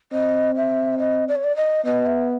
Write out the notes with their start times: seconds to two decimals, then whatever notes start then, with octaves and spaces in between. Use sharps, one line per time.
0.12 C4 D#5
0.56 E5
0.99 D#5
1.28 D5
1.36 C#5
1.44 D5
1.56 D#5
1.85 B3 D#5
2.06 E5